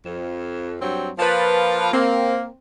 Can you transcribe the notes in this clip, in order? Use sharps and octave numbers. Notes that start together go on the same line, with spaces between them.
F2
G2 F#3 C4
F3 A#3 F4 B4 A5
A#3 C4